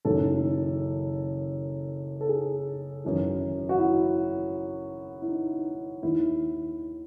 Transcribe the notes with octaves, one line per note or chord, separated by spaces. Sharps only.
F#1 F#2 D#3 A4
A4
G#4
G#1 F#2 E3
F#4
E4
E4
D#4
D#2 D#3 E4